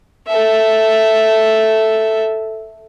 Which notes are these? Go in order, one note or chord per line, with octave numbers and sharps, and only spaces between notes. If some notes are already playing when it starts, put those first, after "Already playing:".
A4 E5